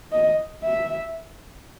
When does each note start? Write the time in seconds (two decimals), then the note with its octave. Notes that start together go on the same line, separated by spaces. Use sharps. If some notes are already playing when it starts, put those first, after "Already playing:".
0.12 D#5
0.63 E5